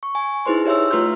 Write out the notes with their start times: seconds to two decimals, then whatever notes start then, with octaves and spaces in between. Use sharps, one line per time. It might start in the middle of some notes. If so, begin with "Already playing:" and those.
0.03 C#6
0.15 G#5
0.46 D#4 E4 G#4 B4 C5 C6
0.66 G4 C#5 E5 C6 E6
0.91 A3 F4 B4 C6 F6 G6